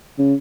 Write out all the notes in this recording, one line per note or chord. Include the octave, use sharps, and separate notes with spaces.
C#3